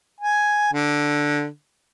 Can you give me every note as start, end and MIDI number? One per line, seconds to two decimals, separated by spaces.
0.20 0.69 80
0.73 1.46 50